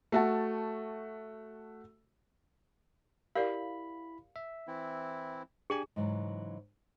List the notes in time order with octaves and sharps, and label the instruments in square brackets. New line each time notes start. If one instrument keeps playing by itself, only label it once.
[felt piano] A3 F#4 A5
[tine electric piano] E4 B5 [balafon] G4 A#4 D5 [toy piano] F5
[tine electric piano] E5
[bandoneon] E3 C4 E4
[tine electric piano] D4 G4 G#5 [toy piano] G#4
[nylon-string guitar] G#2 C#3 E3 F#3